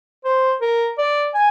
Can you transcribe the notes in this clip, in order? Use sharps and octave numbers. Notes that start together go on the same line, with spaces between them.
C5
A#4
D5
G#5